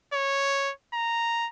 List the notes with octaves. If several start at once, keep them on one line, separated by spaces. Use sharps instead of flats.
C#5
A#5